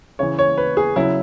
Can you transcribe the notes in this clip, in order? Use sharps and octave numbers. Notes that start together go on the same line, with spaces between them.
C#3 E3 C#5
C#5
B4
G#4
C#3 F#3 E4